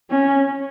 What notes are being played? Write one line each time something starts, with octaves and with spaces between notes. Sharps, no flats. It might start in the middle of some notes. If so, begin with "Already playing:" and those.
C#4